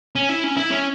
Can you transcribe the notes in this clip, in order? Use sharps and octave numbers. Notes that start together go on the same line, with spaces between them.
C#4
E4
C#4
E4
C#4